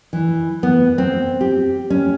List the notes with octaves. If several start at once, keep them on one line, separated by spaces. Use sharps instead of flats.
E3
B3
C4
G4
C#4